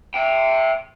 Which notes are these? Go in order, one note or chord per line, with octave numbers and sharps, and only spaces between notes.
E5 G5